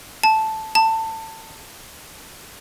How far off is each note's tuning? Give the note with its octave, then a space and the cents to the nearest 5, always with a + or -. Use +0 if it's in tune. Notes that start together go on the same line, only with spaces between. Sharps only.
A5 -5
A5 +20